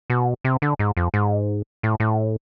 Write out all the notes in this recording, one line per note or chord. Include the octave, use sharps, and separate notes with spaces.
B2
C3
D3
G#2
F2
G#2
A2
A2